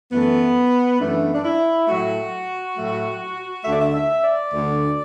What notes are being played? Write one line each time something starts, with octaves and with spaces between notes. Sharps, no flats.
F#2 E3 A3 B3
F#2 E3 A3 D4
B3
D4
E4
A2 F#3 A3 F#4
A2 F#3 A3
D2 D3 A3 E5
D5
E5
E5
D5
D2 D3 A3